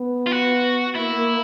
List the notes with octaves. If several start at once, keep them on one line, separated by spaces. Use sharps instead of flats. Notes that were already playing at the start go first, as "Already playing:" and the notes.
Already playing: B3
F4
F#4
A#3 E4
A#3